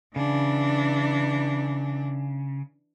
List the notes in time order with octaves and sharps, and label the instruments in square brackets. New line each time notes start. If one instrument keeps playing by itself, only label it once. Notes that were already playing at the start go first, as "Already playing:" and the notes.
[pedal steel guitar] C#3 [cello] E3 D4